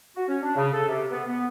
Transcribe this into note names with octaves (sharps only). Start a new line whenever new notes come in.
F#4
C#4
D4
C#3
A4
C3
B3
B3